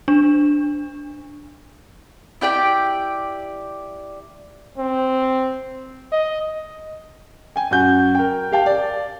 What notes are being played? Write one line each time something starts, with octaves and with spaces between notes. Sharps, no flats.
D4
E4 G4 D5 G5
C4
D#5
G5 G#5
F#2 F#4 G6
A#4 G5
G4 F5 G5 A5
D5